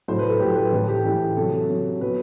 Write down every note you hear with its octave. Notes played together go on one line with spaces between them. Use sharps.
A2 F#3 C5
B4
A4
A2 F#3 G4
B4
A2 E3 A4
G4
A2 E3 G4
C3 F#3 A4
C3 F#3
B2 F#3 B4